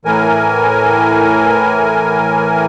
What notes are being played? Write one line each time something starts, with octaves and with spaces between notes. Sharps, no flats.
A2 E3 A#4 G#5